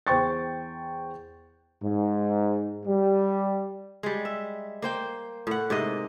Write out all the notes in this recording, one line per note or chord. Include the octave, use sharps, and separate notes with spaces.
E2 C5 G5 C#6 A6
G#2
G3
G3 G#3
E5
A#3 C5 G5
A2 F#5
G#2 C3 A#3 D#5